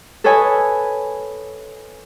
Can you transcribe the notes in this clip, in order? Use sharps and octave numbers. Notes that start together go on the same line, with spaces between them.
A4 B4 C#5 D#5 G#5 B5